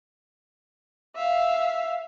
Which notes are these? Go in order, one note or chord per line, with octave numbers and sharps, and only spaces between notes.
E5 F5